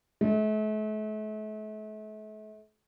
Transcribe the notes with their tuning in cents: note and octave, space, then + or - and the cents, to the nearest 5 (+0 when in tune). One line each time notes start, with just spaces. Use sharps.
A3 -40